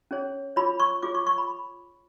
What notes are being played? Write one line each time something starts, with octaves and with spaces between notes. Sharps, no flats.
C#4 G#4 C#5
F4 G#4 C#5 B5
C#6
F4 G#4 C#5 D6
C#6
C#6
B5